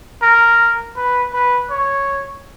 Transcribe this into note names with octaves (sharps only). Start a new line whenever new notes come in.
A#4
B4
B4
C#5